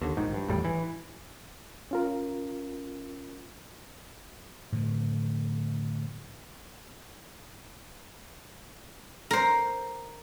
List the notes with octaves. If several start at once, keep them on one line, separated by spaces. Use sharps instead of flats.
D#2 D3
A#1 G#2 D#3
G2
G#1 E2 A2 G3
E3
C#4 F4 A#4
A2 D3 F3
A#4 C5